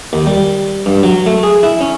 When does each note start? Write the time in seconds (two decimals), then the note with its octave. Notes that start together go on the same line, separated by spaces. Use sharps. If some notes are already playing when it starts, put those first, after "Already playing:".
0.13 D#2
0.27 G3
0.86 G2
1.03 F#3
1.26 A3
1.43 G#4
1.63 E4
1.81 C#4